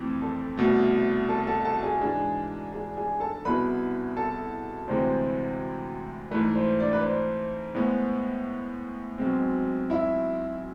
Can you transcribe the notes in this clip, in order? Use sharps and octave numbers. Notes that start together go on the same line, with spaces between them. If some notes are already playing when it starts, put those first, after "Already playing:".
Already playing: F2 E3 A3 C4
A4 A5
C2 B2 A3
A4 A5
A4 A5
A4 A5
G#4 G#5
G#2 E3 G#3 D4 G#4 G#5
G#4 G#5
G#4 G#5
A4 A5
C2 B2 B3 E4 G#4 B4 B5
A4 A5
D2 C3 E3 G#3 C5
G#2 E3 A3 B4
C5
D4 D5
B4
C5
A2 G#3 B3 C5
B1 B2 G#3 C4
E4 E5